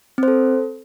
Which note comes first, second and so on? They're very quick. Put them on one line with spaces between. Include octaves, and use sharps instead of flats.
C4 C5 A4